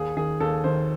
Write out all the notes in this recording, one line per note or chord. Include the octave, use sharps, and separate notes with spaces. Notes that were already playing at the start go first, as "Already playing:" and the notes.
Already playing: D#2 G#4
D#3 G#4
D#2 A4
D#3 C5